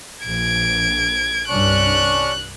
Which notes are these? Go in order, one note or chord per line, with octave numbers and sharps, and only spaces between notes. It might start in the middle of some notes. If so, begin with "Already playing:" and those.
A#1 G#6 D7
C2 G2 C#4 D4 C#6 F#6